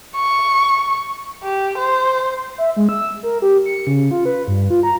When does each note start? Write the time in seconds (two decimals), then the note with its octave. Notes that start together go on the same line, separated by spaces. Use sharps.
0.16 C#6
1.43 G4
1.78 C5
2.58 E5
2.76 G#3
2.89 E6
3.23 A#4
3.42 G4
3.66 C#7
3.87 C#3
4.11 F4
4.26 B4
4.48 G2
4.70 F4
4.83 A#5